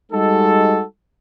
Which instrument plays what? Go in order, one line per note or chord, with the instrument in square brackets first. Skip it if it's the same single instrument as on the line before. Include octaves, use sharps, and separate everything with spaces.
[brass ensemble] G3 G#3 D#4 F#4 A4